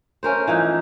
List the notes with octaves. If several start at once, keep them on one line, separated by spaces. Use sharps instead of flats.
A3 C#4 A#4 C5
E3 F3 D#4